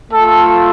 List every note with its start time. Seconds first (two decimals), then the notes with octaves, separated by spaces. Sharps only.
0.11 A3 F4 A4